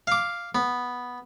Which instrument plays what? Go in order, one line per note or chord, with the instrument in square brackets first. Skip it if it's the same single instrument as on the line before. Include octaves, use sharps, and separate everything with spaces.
[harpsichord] F5 D6
B3